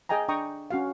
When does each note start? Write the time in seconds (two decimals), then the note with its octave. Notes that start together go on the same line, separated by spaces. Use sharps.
0.09 G#4 D#5 G5 G#5 A#5
0.28 D4 G5 A#5 C#6 D#6
0.71 C#4 F#4 F5